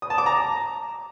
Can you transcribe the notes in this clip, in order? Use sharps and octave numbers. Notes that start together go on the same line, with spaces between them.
D#6
A5
D6
A#5